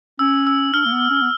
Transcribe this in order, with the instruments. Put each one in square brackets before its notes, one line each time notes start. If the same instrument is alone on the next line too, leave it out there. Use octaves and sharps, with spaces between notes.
[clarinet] C#4 [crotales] E6
[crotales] E6
[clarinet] D4 [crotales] F6
[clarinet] A#3
B3
C#4
B3